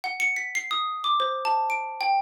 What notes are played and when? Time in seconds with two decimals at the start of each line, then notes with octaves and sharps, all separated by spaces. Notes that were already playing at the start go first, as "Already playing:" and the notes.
0.04 F#5
0.20 C#7
0.36 B6
0.55 C7
0.71 D#6
1.04 D6
1.20 C5
1.45 A5
1.70 D7
2.01 G5